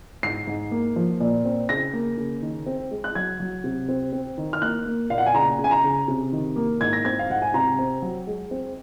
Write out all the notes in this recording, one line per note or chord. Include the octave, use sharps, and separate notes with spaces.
G#2 C7
G#2
A#3
F3
A#2
C4
C#3 A#6
A#3
C#3
D#3
C4
G#3
F#6
F#3 G#6
F#3
C3
C4
C4
D#3
F6
A#3 F#6
A#3
A#2 F5
F#5
G#5
C#3 A#5
C#3
G#5
A#5
C#3
C3
D#3
A#3
G#2 G#6
A#6
C4 G#6
F5
G#2 F#5
G#5
C3 A#5
C4
F#3
G#3
C4